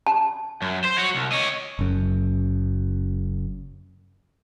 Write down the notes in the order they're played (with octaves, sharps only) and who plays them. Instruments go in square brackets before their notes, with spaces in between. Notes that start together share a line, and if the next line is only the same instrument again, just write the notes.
[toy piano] A5
[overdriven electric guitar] F#2
C5
F#4 C#5
C2
C#5 D#5
[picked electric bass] F#1 F#2